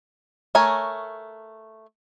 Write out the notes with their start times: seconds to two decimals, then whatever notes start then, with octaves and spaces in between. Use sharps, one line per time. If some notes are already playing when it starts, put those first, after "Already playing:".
0.55 A3 A#4 C#5 G#5